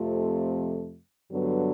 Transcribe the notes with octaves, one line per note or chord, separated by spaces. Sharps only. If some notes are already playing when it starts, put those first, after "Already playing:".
Already playing: F2 C3 F3 A3
G2 D3 F#3 B3